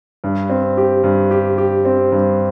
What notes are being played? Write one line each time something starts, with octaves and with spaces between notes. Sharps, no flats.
G2
C4
G4
G2
G4
G4
C4
G2